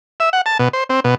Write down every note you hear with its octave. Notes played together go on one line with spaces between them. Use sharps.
E5
F#5
A5
B2
C5
C4
B2